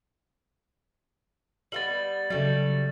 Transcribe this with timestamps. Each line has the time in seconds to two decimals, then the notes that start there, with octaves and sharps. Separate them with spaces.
1.72 G3 A#3 B3 A6 F#7
2.30 C#3 F#3 G3 A3 A6